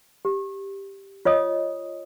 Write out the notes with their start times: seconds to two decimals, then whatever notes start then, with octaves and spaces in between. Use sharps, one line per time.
0.25 G4
1.25 F4 C#5 D#5 D#6